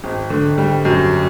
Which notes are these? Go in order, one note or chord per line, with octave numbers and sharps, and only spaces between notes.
G#1
D3
G3
F#2